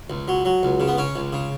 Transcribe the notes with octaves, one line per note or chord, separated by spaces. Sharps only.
C#2
F#3
F#3
C#2
C#3
B3
C#3 C#4
C#2
C#3